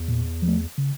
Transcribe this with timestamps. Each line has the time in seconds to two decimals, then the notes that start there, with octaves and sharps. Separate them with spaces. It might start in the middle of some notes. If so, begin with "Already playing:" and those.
Already playing: E2
0.08 A#2
0.42 F3
0.48 A3
0.78 C#3